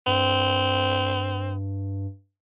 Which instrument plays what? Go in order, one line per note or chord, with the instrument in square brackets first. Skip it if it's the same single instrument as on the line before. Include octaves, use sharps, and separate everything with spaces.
[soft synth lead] G2 [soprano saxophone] C4